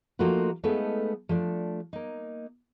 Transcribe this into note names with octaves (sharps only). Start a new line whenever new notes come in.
F3 A3 A#3 D#4 F4 F#4
G#3 A3 B3 D#4 A4 F5
F3 A3 D4
A#3 D#4